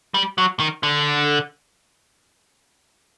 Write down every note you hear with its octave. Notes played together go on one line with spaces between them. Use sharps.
G3
F#3
D#3
D3